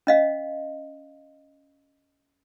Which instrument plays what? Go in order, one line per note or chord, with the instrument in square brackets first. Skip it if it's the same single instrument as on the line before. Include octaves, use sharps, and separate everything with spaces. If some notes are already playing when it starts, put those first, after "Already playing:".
[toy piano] C#4 D#5 F5